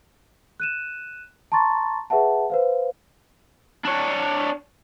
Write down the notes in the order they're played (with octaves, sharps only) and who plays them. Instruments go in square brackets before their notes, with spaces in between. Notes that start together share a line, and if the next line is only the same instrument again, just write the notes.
[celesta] F#6 D#7 E7
A5 A#5 C6 C#6 A6
G#4 B4 E5 F#5 A5
B4 C5 F5
[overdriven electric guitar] D4 C#5